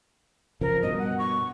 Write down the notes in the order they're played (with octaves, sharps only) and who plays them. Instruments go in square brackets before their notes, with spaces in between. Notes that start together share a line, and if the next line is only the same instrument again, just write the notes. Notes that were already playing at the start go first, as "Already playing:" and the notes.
[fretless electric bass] C#3 F3 [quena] A#4
[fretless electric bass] G2 B2 [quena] D#5
[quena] F#5
C#6